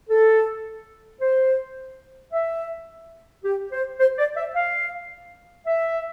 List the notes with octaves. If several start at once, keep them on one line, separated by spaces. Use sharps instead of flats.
A4
C5
E5
G4
C5
C5
D5
E5
F5
E5